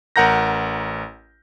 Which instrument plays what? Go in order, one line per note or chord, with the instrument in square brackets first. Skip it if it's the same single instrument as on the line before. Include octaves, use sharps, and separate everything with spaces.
[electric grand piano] A1 A#4 F#5 A#5 G6 A#6